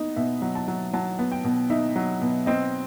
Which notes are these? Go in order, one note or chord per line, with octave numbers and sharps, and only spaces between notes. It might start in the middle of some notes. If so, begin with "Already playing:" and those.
Already playing: B3 D#4
B2 E5
F#3
A5
F#3
F#3 A5
B3
G5
B2
D#4 E5
F#3
B2
C4 D#5